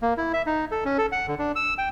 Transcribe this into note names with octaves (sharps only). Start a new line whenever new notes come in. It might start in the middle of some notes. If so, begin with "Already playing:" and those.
A#3
E4
E5
D#4
A4
C#4
A4
F#5
D3
D4
E6
G5